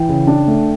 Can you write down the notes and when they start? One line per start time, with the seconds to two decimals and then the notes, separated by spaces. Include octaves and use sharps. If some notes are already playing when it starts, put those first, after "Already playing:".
Already playing: E3 G5
0.09 C#3
0.27 D4
0.48 A3